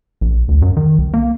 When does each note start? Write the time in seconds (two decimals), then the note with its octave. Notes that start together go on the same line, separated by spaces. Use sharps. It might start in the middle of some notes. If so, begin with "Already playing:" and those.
0.21 A#1
0.48 D2
0.62 F#2
0.77 D#3
0.98 C2
1.14 A#3